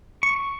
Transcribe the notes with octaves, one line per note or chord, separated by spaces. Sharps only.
C#6